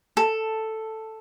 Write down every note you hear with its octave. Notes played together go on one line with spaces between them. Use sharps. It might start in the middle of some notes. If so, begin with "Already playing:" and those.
A4